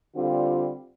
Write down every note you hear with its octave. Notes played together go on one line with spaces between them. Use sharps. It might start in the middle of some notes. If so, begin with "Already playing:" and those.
D3 G3 C4 F4